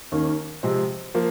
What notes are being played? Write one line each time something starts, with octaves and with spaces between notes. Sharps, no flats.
D#2 D#3 A#3 C#4
C3 F3 G#3 C4
F3 A#3